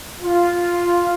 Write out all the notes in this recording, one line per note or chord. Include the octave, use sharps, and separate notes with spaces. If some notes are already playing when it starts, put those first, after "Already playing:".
F4